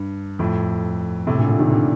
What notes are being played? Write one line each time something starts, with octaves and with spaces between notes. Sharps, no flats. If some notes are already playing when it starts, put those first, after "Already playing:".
Already playing: G2
F2 A2
A2 C3
A#2 D3
A#2 D3
C3 D#3
A#2 D3